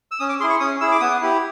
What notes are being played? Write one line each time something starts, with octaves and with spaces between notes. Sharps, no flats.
E6
C#4 D#6
D6
E4 G#4 C6
C#6
C#4 D#6
E4 G#4 E6
D6
B3 D#6
E4 G4